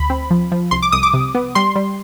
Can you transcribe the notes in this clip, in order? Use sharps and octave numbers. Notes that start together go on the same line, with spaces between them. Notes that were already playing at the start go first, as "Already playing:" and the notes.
Already playing: D2 B5
C4
F3
F3
C2 C6
D6
C2 D#6
D6
C3
B3
G3 C6
G3